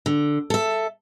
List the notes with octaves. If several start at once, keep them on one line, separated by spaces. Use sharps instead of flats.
D3
A4 E5